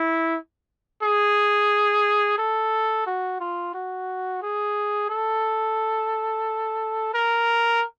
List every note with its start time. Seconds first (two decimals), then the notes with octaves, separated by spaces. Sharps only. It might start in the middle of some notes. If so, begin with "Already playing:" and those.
Already playing: E4
1.03 G#4
2.39 A4
3.07 F#4
3.41 F4
3.74 F#4
4.43 G#4
5.10 A4
7.14 A#4